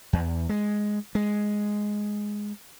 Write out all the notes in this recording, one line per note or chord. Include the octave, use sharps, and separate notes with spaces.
E2
G#3
G#3